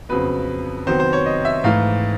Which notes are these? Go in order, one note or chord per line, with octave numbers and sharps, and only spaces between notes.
F2 C#3 F#3 B3 B4
C3 D#3 F#3 B3 C5
C5
C#5
D#5
E5
G#2 E3 A3 F5